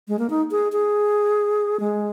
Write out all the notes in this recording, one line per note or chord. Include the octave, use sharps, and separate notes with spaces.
G#3
A#3
D#4
G#4
G#4
G#3